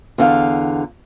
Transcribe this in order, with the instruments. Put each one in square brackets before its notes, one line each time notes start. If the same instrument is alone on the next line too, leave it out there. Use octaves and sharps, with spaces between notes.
[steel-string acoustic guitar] E2 D3 F5